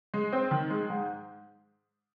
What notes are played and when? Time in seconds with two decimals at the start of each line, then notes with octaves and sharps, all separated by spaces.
0.14 G#3
0.33 C4
0.51 D#3
0.70 G#3
0.90 G#2